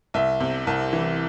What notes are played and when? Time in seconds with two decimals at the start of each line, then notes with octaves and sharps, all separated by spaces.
0.14 C2 E5
0.40 C3
0.67 C2
0.93 E3